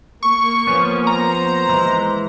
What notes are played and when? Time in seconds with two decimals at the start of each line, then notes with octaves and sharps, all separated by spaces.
0.23 A#3 C#6
0.67 F3 B3 C#4
1.07 C5 A#5
1.69 E3 G#3